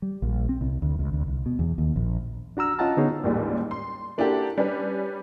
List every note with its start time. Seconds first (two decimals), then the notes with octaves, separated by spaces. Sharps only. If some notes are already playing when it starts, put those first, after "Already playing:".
0.02 G3
0.22 A#1
0.49 C4
0.61 C2
0.82 D2
0.99 C#2
1.13 D2
1.27 C2
1.46 B2
1.59 E2
1.78 D#2
1.96 A#1
2.57 D4 F#4 A#5 E6 F6
2.79 C#4 F4 D#5 F#5 A5 A#5
2.97 D3 B3 D#4 F#4 G#4 C#5
3.24 A1 D#2 A#2 G3 G#3
3.71 C6
4.18 A#3 D4 E4 F#4 G4 A4
4.58 G3 C#4 D4 B4